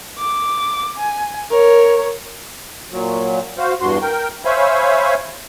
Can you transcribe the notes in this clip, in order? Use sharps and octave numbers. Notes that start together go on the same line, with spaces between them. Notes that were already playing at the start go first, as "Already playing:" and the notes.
D6
G#5
A#4 C#5
A#2 F#3
F#4 C5 F5
E2 G2 F#4 C6
A#4 G5
C5 C#5 E5 F5 G#5 B5